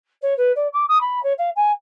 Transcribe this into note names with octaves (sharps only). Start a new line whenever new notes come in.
C#5
B4
D5
D6
D#6
B5
C#5
F5
G#5